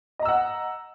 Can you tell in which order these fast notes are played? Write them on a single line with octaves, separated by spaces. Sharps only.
D#5 A#5 E6 F#5